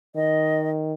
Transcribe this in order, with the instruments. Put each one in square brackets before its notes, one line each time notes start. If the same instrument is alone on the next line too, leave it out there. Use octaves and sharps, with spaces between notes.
[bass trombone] D#3 [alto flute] D#5